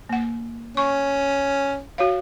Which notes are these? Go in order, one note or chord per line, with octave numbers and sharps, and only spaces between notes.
A#3 F#5
C#4 C#6
F#4 C#5 F5